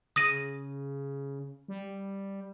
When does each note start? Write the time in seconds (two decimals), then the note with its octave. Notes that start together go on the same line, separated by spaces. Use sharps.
0.16 C#3 D#6 A#6 D#7
1.68 G3